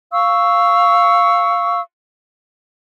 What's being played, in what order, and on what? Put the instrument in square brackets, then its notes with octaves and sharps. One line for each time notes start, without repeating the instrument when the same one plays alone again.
[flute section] F5 C#6 E6